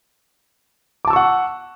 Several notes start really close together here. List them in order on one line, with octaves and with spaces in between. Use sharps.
D6 A5 E6 C#6 F#5